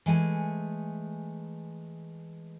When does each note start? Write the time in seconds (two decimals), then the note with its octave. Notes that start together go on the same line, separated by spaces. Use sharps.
0.06 E3 G#3 A3 G#5